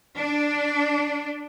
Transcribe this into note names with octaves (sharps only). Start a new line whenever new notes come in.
D4